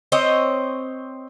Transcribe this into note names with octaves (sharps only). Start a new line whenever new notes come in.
C4 C5 C#5 D#5